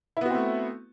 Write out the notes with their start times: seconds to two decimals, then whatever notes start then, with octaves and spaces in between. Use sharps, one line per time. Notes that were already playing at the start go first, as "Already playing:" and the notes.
0.17 E4
0.21 B3
0.26 F#4
0.30 C4
0.35 A3